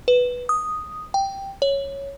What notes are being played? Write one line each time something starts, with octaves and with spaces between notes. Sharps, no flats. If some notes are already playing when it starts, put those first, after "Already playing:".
B4
D#6
G5
C#5